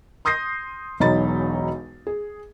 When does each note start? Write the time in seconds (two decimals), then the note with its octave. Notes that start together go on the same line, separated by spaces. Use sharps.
0.25 C6 D#6 G6 A#6 C7
1.00 E1 B1 D#4 C#5 B5 A6
2.07 G#4